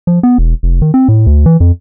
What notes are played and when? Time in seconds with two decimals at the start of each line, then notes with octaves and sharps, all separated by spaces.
0.07 F3
0.23 B3
0.38 E1
0.63 F1
0.82 D#3
0.94 C4
1.08 A2
1.26 D2
1.46 E3
1.60 F2